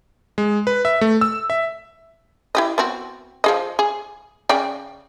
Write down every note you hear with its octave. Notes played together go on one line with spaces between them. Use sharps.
G#3
B4
E5
A3
E6
E5
E4 G4 D#5
B3 C4 F#4
F3 G#4 D#5
G#4
C#3 D5 G5